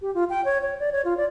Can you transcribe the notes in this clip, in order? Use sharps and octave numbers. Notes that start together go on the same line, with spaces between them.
G4
F4
G5
C#5
C#5
D5
C#5
F4
D5